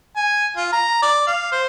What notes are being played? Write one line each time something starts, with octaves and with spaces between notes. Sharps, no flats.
G#5
F4
A#5
D5
F5
C5